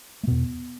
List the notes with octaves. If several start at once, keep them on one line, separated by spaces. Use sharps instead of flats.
A3
E2 B2 B3